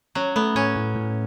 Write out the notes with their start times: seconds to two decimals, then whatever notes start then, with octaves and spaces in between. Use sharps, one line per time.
0.15 F#3 C#4
0.36 A3 B3
0.55 A2 C#4
0.76 A2
0.96 A2